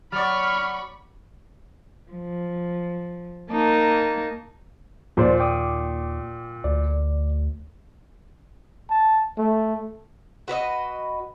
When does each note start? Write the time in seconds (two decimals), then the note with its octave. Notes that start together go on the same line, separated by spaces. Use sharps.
0.12 F#3 D5 B5 C#6 F6
2.11 F3
3.52 A#3 D#4 A5
5.17 D#2 A#2 F3 C5 D5
5.40 G5 D6 D#6
6.64 D2 D5
8.90 A5
9.38 A3
10.48 F#4 B4 C#5 D#5